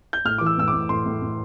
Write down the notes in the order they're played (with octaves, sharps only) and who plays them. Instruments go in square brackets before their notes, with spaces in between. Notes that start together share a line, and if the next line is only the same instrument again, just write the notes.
[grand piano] G6
A2 F6
E3 D6
E6
A2 E6
D6
A2
A2 C6
A2
A2